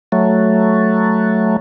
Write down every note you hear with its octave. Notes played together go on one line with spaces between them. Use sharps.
F#3 A3